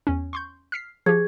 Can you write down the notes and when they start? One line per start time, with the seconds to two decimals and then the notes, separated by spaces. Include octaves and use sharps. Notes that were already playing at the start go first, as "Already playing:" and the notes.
0.07 E2 C#4
0.33 C6 C#6 G6
0.72 F6 B6 C7
1.06 F3 G4 G#4 G#6